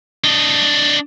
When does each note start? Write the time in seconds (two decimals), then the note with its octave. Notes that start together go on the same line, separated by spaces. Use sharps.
0.24 D4 D#5